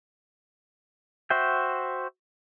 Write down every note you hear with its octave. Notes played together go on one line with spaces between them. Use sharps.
F#4 C5 E5 G5